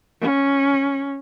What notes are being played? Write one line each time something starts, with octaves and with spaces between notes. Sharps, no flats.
C#4